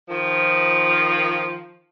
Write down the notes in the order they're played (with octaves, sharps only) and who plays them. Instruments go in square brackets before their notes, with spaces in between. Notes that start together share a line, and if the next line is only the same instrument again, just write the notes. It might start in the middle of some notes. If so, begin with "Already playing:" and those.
[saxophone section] D#3 F3